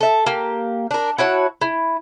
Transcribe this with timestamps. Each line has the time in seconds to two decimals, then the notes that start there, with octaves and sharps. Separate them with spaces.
0.01 A4 E5
0.26 A#3 G4
0.91 D4 A#4
1.18 E4 F#4 C#5 A5
1.61 E4